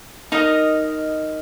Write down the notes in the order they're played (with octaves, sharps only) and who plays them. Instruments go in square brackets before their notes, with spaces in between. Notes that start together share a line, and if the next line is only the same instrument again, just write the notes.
[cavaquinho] D#4 A#4 D#5